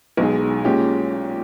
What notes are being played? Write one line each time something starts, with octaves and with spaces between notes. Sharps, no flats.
B1 B2 G#3 D#4 G#4
A#2 G#3 C#4 G4